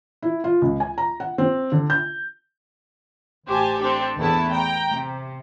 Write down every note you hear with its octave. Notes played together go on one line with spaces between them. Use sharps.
E4
F4
C#2
G#5
A#5
F#5
C4
D3
G6
A1 G4 C5 G#5 A5
C4 D4 G4 A4
E2 A3 B3 E4 A5
G5 A#5
C3